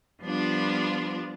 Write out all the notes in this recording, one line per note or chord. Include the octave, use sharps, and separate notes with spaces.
F3 G3 B3 D4 F4